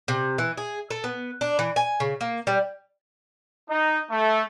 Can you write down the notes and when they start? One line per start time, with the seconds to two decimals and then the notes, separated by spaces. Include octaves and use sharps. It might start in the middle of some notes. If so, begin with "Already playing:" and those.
0.08 C3
0.38 E3
0.57 G#4
0.91 A4
1.04 B3
1.41 D4
1.59 E3
1.76 G#5
2.00 C#3
2.21 A#3
2.47 G3
3.69 D#4
4.10 A3